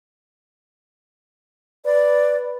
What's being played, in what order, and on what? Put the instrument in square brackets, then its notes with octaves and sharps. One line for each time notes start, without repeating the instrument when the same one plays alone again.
[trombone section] B4 [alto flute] D5